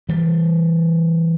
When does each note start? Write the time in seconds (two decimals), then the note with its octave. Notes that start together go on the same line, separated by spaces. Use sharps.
0.09 E3 G3